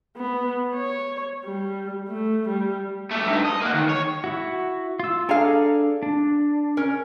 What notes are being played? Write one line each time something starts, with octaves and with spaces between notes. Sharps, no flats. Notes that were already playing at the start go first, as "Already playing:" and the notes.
B3
C#5
G3
A3
G3
A3 G4
G2 D#4
D#5
A#3 F#4
D#3
C#5
E4 F#4
F4 E6
D4 G#4 A4 F5 A#5
D4
C#4 A#4